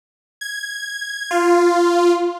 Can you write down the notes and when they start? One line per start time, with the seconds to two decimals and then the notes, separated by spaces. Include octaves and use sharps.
0.41 G#6
1.31 F4